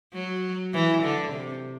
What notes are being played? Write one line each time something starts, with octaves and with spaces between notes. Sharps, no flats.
F#3
E3
D3
C3